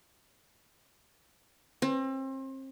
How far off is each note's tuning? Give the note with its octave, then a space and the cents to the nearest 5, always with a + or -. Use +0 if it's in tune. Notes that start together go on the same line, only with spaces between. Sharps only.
C4 +35